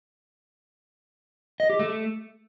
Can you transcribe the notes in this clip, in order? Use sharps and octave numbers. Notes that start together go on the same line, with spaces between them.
D#5
G4
A3